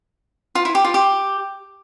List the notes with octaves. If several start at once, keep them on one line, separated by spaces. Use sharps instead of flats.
F4
E4
G4
F4
G4